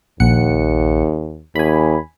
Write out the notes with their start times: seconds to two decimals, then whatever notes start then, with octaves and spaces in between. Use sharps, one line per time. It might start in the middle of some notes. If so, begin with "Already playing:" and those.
0.20 A#1 D#2 F#5 C#7
1.56 D#2 G#5 B5